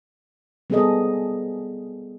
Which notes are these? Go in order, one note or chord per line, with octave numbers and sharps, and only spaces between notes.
G3 B3 C4 G#4 A4 D#5